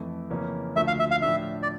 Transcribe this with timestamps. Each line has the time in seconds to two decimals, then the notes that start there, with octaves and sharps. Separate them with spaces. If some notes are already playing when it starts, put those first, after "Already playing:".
Already playing: F2 E3 A3
0.30 F2 C#3 E3 A#3 C#4
0.76 D2 D3 F3 A3 E5
0.87 F5
0.99 E5
1.11 F5
1.22 A2 F3 A3 D4 E5
1.63 D5